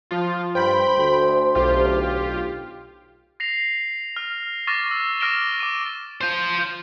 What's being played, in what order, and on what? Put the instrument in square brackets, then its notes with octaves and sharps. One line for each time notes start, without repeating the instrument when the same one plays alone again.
[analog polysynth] F3 F4
[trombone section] G2 [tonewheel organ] C5 [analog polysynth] G5 B5
[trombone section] D2
[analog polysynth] B1 F4 G4
[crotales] A#6 C7 F7
F6
C#6 D6 F6 A6 A#6
E6
D6 F6 A#6 D7 E7 G7
D6 D#7
[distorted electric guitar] F4 C5 [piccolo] G6